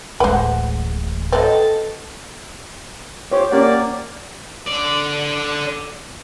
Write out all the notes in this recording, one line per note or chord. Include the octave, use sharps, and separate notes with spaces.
D1 A1 G#3 B4 C5 F#5
F#3 C4 A4 B4 D#5
F4 G4 C5 C#5
A#3 C#4 G4 D5 F#5
D3 D5